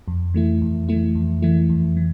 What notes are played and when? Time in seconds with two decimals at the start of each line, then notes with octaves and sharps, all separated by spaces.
0.08 F2
0.34 E3 A3 E4
0.62 F2
0.89 E3 A3 E4
1.15 F2
1.42 E3 A3 E4
1.69 F2
1.97 E3